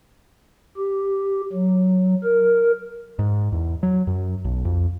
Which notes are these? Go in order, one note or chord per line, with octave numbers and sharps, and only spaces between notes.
G4
F#3
A#4
G#2
E2
F#3
F#2
B1
F2